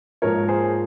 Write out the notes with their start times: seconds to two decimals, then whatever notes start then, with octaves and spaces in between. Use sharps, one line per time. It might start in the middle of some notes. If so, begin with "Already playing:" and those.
0.22 G#2 F3 A#3 A#4 C#5
0.48 G#4 C5